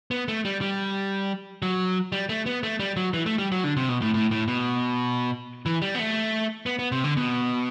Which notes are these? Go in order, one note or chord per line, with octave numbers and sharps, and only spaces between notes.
B3
A3
G3
G3
F#3
G3
A3
B3
A3
G3
F#3
E3
A3
G3
F#3
D3
C3
B2
A2
A2
A2
B2
E3
G3
B3
A3
B3
B3
C3
D3
B2